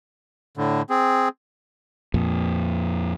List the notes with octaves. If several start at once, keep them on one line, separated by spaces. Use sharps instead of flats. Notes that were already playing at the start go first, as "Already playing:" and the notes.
A2 D3
C4 G#4
F2 A#2